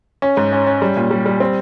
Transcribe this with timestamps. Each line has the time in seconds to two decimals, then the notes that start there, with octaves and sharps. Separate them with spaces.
0.22 C#4
0.37 G#2
0.52 C#4
0.67 C#4
0.82 G3
0.97 A#2
1.11 G3
1.26 G3
1.40 C4